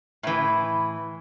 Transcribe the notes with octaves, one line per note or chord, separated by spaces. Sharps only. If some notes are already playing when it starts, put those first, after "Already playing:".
A2 E3